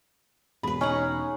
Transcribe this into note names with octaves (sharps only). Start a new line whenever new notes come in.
E1 G#4 B4 B5
C#4 D#4 G#4 A#4 F#5